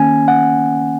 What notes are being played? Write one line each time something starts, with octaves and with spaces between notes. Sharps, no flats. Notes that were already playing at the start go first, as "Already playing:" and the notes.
Already playing: D#3 A#3 C#4 G#5
F#5